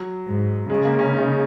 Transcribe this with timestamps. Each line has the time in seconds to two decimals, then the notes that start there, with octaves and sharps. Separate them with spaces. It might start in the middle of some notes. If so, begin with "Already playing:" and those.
Already playing: F#3
0.28 G#2
0.70 C#3 G#3
0.85 A#3
0.99 C#4
1.13 D#4